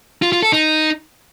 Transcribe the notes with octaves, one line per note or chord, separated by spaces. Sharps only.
F4
F4
A4
D#4